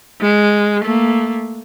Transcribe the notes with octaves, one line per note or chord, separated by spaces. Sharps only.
G#3
A3 A#3